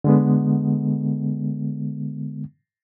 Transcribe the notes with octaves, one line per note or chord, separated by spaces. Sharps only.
D3 G#3 B3